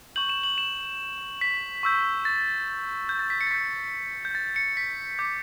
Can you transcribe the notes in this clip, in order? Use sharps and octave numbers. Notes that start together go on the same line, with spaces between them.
C#6 G6 F#7
E7
F#7
E7
B6
C#6 E6 G6
A6
G6
A6
B6
C#7
A6
C#6 E6 G6 B6
G6
A6
C#7
B6
D6 G6